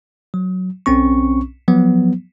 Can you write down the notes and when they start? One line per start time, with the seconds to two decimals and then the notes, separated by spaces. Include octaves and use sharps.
0.34 F#3
0.86 B1 C4 C#4 C#6
1.68 F3 F#3 B3